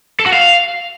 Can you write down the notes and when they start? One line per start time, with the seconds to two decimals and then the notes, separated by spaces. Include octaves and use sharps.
0.19 A4
0.26 F#4
0.33 F5